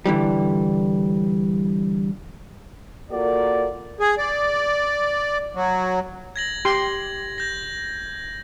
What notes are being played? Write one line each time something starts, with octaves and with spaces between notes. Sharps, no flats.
D3 E3 G3
A#3 F4 F#4 A4 A#4 D5
G#4
D5
F#3
G#6 A#6 F#7
G4 C6
G6 A#6